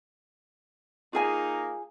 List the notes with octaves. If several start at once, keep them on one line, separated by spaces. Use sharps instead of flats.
A#3 D#4 F4 G#4 G#5